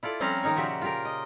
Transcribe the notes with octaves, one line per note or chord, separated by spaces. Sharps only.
E4 F4 A4 D5
F3 G3 C4 C#4 F5 A#5
D#3 D#4 C#5
A#2 C#3 F3 F#4 G4 E5
F4 G4 A#4
D#5